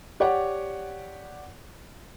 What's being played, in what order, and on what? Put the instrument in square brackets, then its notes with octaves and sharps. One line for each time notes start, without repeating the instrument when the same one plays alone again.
[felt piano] G4 C#5 D5 F#5